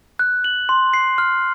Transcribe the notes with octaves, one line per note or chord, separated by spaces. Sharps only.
F#6
F#7
C6
C7
F6